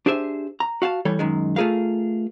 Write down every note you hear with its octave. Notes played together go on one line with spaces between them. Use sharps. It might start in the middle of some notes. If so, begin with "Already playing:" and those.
D4 G4 G#4 C5 E5
A#5
F#4 F5 F#5 A5
E3 G3 A4 C#5
F#2 D#3 G#3
A3 F4 G#4 A#4 F5